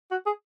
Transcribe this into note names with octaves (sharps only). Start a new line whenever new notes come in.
F#4
G#4